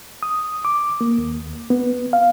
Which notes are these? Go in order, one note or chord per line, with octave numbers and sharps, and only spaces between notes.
D#6
D6
A#3
D#2
B3
F5